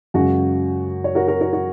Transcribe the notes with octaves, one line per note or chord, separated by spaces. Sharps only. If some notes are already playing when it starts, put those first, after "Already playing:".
F#2 C#3 G#3 F#4
C#5
F#4 A#4
F#4 A#4
F#4 A#4
F#4